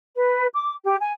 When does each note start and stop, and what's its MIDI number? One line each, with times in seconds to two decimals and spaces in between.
0.15 0.46 71
0.54 0.74 86
0.84 0.95 67
0.99 1.11 80